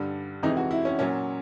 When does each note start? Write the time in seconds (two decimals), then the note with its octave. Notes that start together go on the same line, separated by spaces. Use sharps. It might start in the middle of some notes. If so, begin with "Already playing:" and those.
Already playing: G2 D3 G3
0.43 F2 C3 E3 G#3 D#4
0.57 F#4
0.71 E4
0.85 C#4
0.99 A#2 F#3 C#4